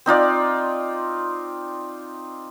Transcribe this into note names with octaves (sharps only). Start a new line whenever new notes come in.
C4 D#4 F4 D5